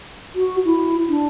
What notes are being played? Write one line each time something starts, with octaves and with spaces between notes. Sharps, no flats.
F#4
E4
D4